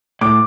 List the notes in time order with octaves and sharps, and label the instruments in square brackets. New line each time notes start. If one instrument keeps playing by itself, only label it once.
[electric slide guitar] A2 [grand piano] D6